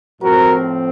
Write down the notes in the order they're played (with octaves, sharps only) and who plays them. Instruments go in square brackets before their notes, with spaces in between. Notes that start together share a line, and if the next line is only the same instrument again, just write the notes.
[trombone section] A2 F3 C4 F#4 A#4